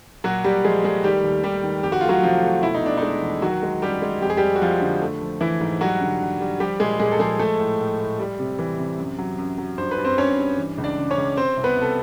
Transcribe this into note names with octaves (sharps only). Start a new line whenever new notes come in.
A#2 F#3 F#4
A#2 G3 G4
F3 G#3 G#4
G#3 A3 G#4
D#3 G3 G4
D#2
D#3 G3 G4
D#3
F2 G4
F#4
A3 F4
F#3 F#4
C3 F3 F4
A3
B2 E4
D#4
B2 D4
G#3 D#4
E2
D#3 F#3 F#4
G#3
F#2 G3 G4
G#3
F2 G4
G#4
F2 G3 G4
F#4
F2 F3 F4
D3
A3
F3
E3 A3 E4
G#2
F#3 G3 F#4
D3
D3
G3
F3 G3 G4
A#2 G#3 G#4
A#2 G#3 G#4
A4
F3 G#3 G#4
G#3 A3 A4
A2
A2
A2
G3
C3
E3
C3
F#2
F#3
F#2
F#3
G2 C5
B4
G2
C4 C5
G2 C#4 C#5
G2
E3
C#2
D4 D5
C#3
C#4 C#5
C#2
C3 C4 C5
C2
B3 B4
C2 A4